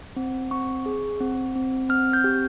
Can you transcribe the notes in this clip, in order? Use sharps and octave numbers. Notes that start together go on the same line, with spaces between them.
C4
C4 C#6
G#4
C4
C4
C4 F6
G6
G4